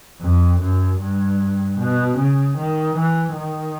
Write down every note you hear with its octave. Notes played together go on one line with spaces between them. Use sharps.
F2
F#2
G2
B2
C#3
D#3
E3
D#3